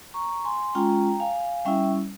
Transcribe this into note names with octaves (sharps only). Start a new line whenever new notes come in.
A#5 C#6
G#5 C6
G#3 C#4 F4 G5 A#5
F5 G#5
G3 C#4 E4 E5 G5